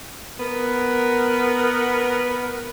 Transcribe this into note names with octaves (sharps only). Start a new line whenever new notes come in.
B3 A#4